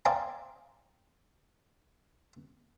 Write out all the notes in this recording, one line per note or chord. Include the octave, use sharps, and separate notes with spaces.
C5 D5 F5 G5 G#5 A#5